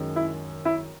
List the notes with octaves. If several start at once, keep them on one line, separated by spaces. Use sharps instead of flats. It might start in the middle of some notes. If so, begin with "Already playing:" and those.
Already playing: F#2 D#3 G#3
E4
E4